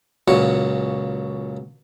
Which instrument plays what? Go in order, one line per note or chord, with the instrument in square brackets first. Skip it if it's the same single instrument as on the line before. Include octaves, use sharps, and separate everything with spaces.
[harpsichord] C#2 A#2 F#3 C#5